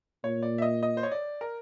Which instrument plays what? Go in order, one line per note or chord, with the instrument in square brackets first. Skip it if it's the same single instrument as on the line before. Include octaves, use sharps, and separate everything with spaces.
[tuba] A#2 [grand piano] C#5
[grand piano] D5
E5
D#5
D#5
C5
C#5
D5
A#4